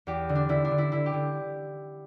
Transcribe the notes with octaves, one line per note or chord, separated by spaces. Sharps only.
E2 G4
D3
D4
D3 E4
D4
D3
E4
D3 E4
G4
D3